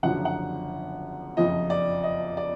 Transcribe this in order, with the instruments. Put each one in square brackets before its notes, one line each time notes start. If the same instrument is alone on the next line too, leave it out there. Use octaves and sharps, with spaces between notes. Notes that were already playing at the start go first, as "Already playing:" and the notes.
[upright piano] F#1 F#2 D3 F3 F#5
F#5
F#1 F2 F3 D#5
D5
D#5
D5